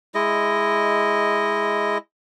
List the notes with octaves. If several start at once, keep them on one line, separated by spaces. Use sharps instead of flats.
G#3 E4 D#5